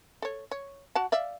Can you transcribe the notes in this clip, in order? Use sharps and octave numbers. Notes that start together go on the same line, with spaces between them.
A4 C#5
C#5
F#4 F#5 A5
D5 E5 F5